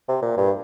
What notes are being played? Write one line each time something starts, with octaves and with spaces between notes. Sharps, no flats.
C3
A#2
G2